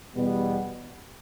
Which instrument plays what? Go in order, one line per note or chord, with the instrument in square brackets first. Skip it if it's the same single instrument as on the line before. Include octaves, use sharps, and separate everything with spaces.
[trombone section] E2 B2 G3 B3